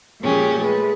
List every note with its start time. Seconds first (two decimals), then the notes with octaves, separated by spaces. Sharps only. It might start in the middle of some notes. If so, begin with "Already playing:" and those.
0.21 A#2 F3 G#3 C#4 G4
0.58 G#3 A3 B4